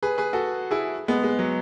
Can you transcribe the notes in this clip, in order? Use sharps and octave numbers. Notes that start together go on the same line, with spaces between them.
G#4 B4
G#4 B4
F#4 A4
E4 G#4
G#3 B3
G#3
F#3